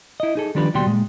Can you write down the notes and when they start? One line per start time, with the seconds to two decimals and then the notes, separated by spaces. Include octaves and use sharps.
0.20 E4 D#5
0.35 D#4 G#4 A4
0.55 D#3 F3 G3 D4 G4 B4
0.74 D#2 B2 G3 F#4 G5 C6
0.86 A#2 G#3